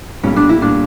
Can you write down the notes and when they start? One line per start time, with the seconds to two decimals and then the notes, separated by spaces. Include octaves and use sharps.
0.23 B1 A#2 G3 C#4
0.36 D4
0.49 E4
0.62 A#2 G3 D4